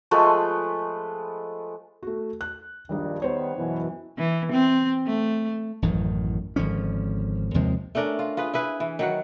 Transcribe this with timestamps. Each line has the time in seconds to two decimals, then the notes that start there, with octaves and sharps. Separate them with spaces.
0.11 F3 G#3 A3 B4
2.03 A3 F#4
2.41 F#6
2.89 A#1 G2 D#3 G3 D#4
3.22 D#3 G3 B3 C5 C#5
3.56 F#2 B2 E3
4.18 E3
4.52 C4
5.06 A3
5.82 A1 F#2 A2 D#3
6.56 G#1 D3 F3 C#4
7.54 D#2 C3 F3 G#3
7.95 A3 C#4 D4 A#4
8.19 F4
8.37 F4 G#4 B4
8.54 E4 G#4 B4
8.80 E3
8.99 D#3 F#3 F#5